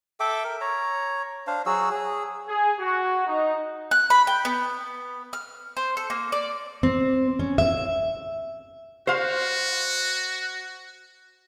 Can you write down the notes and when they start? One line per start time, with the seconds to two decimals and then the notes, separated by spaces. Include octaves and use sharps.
0.20 A4 E5 G5 D6
0.44 A#4
0.61 C#5 A#5
1.47 D4 C5 F5
1.66 F#3 F#4 G#4 E6
1.91 G#4
2.47 G#4
2.78 F#4
3.26 D#4
3.91 F#6
4.10 B5
4.27 G5
4.45 B3
5.33 F6
5.77 C5
5.97 A4
6.10 A#3
6.32 D5
6.83 C4
7.39 C#4
7.58 E5
9.07 F#4 C5 F5